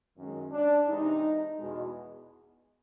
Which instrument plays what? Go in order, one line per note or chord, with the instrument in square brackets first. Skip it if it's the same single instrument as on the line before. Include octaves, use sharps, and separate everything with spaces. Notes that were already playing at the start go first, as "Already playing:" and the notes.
[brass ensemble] F#2 D#3 G#3 C#4
D4
C3 E3 G#3 D#4
E2 B2 G#3